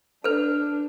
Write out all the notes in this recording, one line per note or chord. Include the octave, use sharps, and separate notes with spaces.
D4 A4 B4